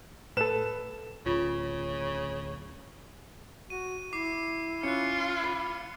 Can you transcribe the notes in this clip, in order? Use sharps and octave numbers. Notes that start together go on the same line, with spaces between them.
A2 A4 B4 E7
D1 C#3 F4
F#4 D#7
E4 D6 C7
C#4 F4 F#6 C#7
B5